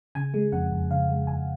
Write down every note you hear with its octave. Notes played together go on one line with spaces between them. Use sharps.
C#3 G#5
G#3
F2 F#5
F2
C#3 F5
G#3
F2 G#5